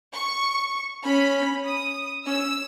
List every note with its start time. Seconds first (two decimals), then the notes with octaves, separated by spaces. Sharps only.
0.13 C#6
1.04 C#4 B5
1.65 D#6
2.26 C#4 E6